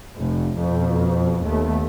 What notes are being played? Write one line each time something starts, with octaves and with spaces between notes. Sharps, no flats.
F1
F2 B2
D#2 A3 B3